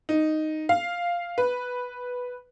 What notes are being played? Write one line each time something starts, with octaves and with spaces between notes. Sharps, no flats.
D#4
F5
B4